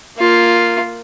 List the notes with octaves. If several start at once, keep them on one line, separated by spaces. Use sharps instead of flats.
A#3 F4